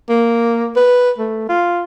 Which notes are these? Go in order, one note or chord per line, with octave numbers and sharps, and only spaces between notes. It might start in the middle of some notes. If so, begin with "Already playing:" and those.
A#3
B4
A3
F4